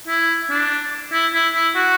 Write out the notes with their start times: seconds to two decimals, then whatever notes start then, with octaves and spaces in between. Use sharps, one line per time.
0.08 E4
0.50 D4
1.12 E4
1.33 E4
1.54 E4
1.75 F#4